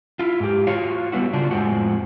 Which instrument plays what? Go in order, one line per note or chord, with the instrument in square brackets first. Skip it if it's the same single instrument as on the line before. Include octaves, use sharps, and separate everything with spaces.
[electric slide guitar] E4 F4
G#2 G4
F4 F#4 C#5 F5
G3 G#3 B3 E4 F#4
C#3 D4 F4
F2 A2 F3 G#3 C4 F#4